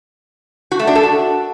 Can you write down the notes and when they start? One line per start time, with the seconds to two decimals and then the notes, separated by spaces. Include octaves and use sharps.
0.71 F#4
0.79 A3
0.87 D4
0.95 A4
1.03 F#4